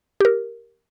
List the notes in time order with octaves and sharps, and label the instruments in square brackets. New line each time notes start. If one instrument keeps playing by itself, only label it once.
[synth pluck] G4 A#4